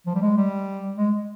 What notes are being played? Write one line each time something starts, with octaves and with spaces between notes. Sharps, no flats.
F3
G3
G#3
G3
G#3